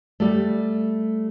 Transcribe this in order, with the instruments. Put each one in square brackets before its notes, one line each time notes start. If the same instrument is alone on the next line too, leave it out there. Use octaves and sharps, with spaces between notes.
[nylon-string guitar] G3 A3